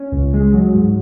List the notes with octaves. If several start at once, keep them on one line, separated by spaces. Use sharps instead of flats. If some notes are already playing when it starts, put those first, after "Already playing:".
Already playing: C#4
C#2
G#3
F#3
G#2